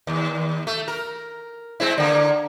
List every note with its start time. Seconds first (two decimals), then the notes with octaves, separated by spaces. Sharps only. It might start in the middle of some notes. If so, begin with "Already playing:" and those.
0.07 D#2
0.67 A3
0.88 A#4
1.80 G#3 C4 E4
1.98 D3 A#3